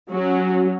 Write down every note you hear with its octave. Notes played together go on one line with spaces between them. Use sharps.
F#3 C#4 F#4